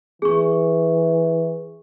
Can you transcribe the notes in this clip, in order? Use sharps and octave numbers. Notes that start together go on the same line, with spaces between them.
E3 G#4 C#6